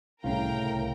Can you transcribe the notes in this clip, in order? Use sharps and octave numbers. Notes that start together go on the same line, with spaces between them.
C2 A2 C#3 A#4 F5 G5 A#5